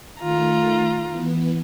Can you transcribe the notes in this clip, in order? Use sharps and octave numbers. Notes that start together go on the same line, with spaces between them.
D#3 A3 F4 A#5
E3 B3